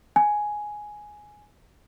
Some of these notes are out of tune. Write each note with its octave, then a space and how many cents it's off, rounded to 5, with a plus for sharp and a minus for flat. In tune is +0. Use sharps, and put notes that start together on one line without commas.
G#5 +5